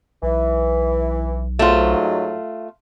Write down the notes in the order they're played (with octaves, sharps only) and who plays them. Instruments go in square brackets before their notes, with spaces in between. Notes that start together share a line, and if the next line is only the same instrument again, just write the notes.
[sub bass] B1 [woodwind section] E3
[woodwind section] G#2 F#3 [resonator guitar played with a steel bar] A3 F4